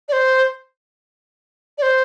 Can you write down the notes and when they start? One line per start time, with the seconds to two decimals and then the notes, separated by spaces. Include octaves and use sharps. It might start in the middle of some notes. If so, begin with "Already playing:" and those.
0.08 D5
0.12 C5
1.78 D5
1.82 C5